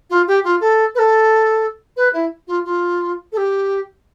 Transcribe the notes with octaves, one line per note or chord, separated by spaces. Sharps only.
F4
G4
F4
A4
B4
A4
B4
E4
F4
F4
A4
G4